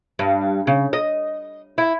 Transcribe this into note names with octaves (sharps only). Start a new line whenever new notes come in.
G2
C#3
D#5
E4